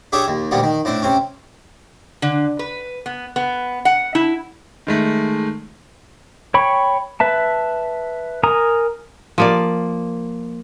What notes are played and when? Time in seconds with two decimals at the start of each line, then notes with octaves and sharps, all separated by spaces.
0.12 D4 G4 G#4 C#5 E5
0.28 D#2
0.51 D2 A#2 G3 B3
0.63 D#3
0.85 A2 C4 D4
1.02 C3 C4 C#4
2.22 D3
2.59 B4
3.06 B3
3.36 B3
3.85 F#5
4.15 E4
4.87 D#3 G#3 A3
6.54 C#5 G5 B5 C#6
7.20 B4 E5 A5
8.43 A#4 G#5 A#5 D#6
9.38 F3 A#3 D5